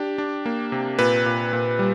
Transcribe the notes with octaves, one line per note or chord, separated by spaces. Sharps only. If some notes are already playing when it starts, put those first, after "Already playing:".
Already playing: D4 G4
D4
A#3
C3
A#2 B4
A#2
A#2
G3